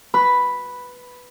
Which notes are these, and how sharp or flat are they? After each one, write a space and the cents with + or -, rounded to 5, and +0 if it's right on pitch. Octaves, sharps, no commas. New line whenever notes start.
B4 +0 B5 +0